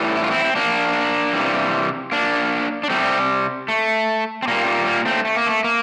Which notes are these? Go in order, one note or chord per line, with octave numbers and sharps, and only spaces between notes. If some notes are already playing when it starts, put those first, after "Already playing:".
Already playing: A2 E3 G3
E4
F4
C4 E4
C4
A#3 D4
C3 E3 G3
A#3 D4
D4
C3 G3 A3 C4
A3
C4
A#2 G3 A#3
A#3
A#3
A3 C4
A3
A#3
A3
A#3